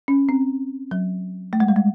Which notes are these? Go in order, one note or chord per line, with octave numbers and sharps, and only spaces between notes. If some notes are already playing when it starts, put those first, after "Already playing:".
C#4
C4
F#3
A3
G#3
G3
G#3